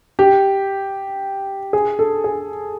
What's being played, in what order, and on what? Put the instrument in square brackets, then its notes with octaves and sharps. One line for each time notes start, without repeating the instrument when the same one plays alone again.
[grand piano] G4
G#4
A4
G#4